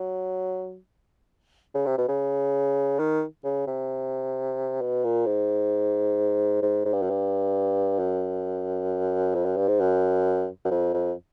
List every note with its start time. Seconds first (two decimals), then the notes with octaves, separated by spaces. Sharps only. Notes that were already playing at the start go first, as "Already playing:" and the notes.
Already playing: F#3
1.75 C#3
1.86 C3
1.98 B2
2.08 C#3
2.99 D#3
3.44 C#3
3.67 C3
4.81 B2
5.04 A#2
5.26 G#2
6.62 G#2
6.85 G#2
6.93 G2
7.02 F#2
7.10 G2
7.99 F#2
9.35 F2
9.45 F#2
9.56 G2
9.68 G#2
9.80 F#2
10.65 F#2
10.71 F2
10.94 F2